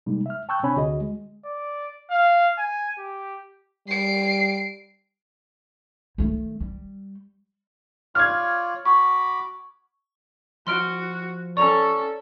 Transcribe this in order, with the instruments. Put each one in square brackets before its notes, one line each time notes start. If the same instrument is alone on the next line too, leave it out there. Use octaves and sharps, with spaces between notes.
[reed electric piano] C3 G3 G#3 A#3 D#4
E5 F6
G5 A5 C#6 E6 F#6 G6
C3 C4 D4 C#5 G#5 B5
D2 D3 F#4 G#4 D#5
G#3
[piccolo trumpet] D5
F5
G#5
G4
[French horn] G3 [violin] C7 D7
[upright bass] D#3 A3
G3
[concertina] F4 C#5 D5 [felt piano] F6 G#6
[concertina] F#4 B5 D6 [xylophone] C#6
[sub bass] F3 [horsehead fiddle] F#4 [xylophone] C6 F6 D7
[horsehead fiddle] C#4 A4 [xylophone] D5 A#5 [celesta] C#6